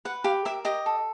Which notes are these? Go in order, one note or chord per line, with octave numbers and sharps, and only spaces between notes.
B4 F#5
G4 F5
A#4 E5
G4 D#5
A4